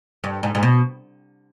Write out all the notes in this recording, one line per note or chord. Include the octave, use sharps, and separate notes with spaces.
G2
G#2
G#2
B2